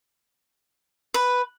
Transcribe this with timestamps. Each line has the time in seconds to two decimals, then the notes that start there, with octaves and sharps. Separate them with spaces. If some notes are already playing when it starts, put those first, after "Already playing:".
1.14 B4